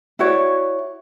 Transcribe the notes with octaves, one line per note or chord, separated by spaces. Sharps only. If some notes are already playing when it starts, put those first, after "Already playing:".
E4 F#4 C#5 D5